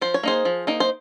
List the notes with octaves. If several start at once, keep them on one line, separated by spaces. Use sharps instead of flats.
F3 C5
C#5
A#3 D#4 G#4 C5
F3
A#3 D#4
C5